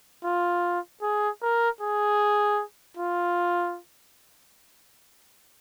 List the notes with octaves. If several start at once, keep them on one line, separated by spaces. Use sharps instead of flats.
F4
G#4
A#4
G#4
F4